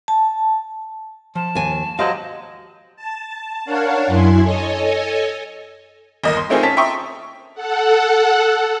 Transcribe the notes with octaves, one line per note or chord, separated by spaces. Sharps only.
A5
F3 A5
D#2 G#5
F#3 G#3 F#4 G4 C5 D#5 F5
A5
D4 A#4 C#5 F5 F#5 A5
F#2 E4 G#5 C6
A4 C#5 D#5 G#5
G1 D#2 A#3 D#5
C6
A3 A#3 C4 D#4 F4 G#4
C#4 A5 B6
E5 G5 A#5 C6 C#6 D#6
A4 F#5